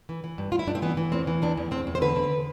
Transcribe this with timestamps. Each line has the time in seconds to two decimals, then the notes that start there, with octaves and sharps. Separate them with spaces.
0.09 E3
0.24 E3
0.38 G2
0.52 G2 F4
0.59 E4
0.67 G2 D4
0.75 C4
0.82 E3 B3
0.97 E3
1.12 E2 C4
1.27 E3
1.42 E2 D4
1.57 E2
1.71 E2 C4
1.87 E2
1.95 C5
2.01 D3 B4
2.16 D3